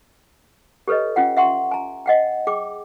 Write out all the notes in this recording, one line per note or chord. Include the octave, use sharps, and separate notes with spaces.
G4 A4 B4 C#5 D#5
C#4 F4 F#5 G5
E5 F#5 C6 C#6
G#5 A#5
D#5 F#5 G5
G#4 G5 D6